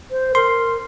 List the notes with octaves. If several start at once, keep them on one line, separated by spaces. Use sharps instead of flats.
C5
A#4 C6